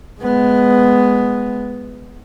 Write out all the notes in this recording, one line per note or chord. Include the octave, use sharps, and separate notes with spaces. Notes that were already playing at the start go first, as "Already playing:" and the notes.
G#3 B3